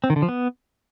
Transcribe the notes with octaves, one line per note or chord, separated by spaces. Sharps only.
C4
D#3
D3
F3
B3